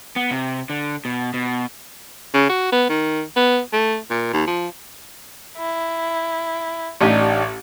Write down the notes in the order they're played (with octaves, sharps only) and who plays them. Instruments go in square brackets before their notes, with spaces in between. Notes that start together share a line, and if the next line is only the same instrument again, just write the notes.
[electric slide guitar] B3
C3
D3
B2
B2
[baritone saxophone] C#3
F#4
B3
D#3
B3
A3
A#2
D#2
F3
[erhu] E4
[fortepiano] A1 [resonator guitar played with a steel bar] D4 D#4 G4